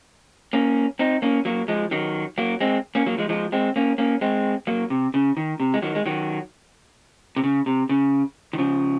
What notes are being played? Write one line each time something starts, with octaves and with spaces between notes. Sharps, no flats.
A#3 C#4
C4 D#4
A#3 C#4
F#3 A#3
F3 G#3
D#3 F#3
F#3 A#3
G#3 C4
A#3 C#4
F#3 A#3
F3 G#3
F3 G#3
G#3 C4
A#3 C#4
A#3 C#4
G#3 C4
F#3 A#3
C3
C#3
D#3
C3
G#3
D#3 F#3
G#3
D#3 F#3
C3
C#3
C3
C#3
D#3
C#3 F3